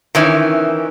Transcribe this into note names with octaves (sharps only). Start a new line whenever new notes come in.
D#3 E3 C#4